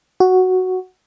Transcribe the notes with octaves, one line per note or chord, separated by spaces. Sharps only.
F#4